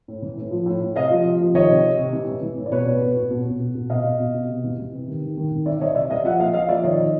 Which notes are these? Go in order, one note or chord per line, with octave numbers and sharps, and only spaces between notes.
A2
E3
A2
F3
A2
A2
C3 D#5 F5
F3
C3
F3
D#3 C#5 D#5
C3
C3
C3
E3
E3
E3
A2
D5
B2 B4 C#5
B2
B2
B2
B2
B2
B2
B2
B2 D#5 F5
B2
B2
B2
C3
E3
E3
C3
D#3
D#3
D#3
D#3
E3 D5 E5
E5
E3 C#5 D#5
C3 D5 E5
E3 D#5 F5
F3 E5 F#5
A#2 D#5 F5
F3 D#5 F5
F3 D5 E5
D#3 C#5 D#5
D#3